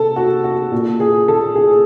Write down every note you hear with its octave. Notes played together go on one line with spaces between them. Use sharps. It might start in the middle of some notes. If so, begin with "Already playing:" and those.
Already playing: C3 A4
F#4
F#4
A#2
G#4
A4
G#4